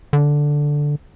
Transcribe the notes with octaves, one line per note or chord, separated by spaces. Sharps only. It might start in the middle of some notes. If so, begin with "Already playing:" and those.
D3